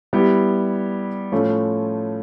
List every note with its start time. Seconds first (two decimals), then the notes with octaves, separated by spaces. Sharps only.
0.13 G3 B3 E4 G4
1.32 A2 F3 A3 C#4 F4